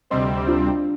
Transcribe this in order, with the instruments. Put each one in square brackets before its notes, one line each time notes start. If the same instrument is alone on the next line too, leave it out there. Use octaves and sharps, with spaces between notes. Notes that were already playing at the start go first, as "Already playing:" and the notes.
[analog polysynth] D2 C3 G3 C4 [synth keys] C5 D#5
[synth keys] D4 F4